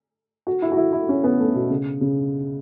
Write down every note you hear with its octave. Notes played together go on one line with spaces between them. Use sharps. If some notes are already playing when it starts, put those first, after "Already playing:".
F#4
E4
F#4
E4
E4
C#4
B3
A3
B2
C#3
C#3